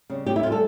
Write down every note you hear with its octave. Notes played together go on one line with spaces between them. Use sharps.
C#3 G3
A2 G4
E4
E3 G3 F4
A4